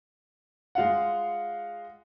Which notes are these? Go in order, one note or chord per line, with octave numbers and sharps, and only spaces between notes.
G#3 F4 F5 F#5